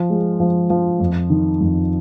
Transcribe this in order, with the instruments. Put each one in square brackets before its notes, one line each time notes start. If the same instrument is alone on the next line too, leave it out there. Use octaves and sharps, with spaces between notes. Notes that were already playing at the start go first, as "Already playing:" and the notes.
Already playing: [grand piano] F3
G#3
F3
F3
F2
D#3
F2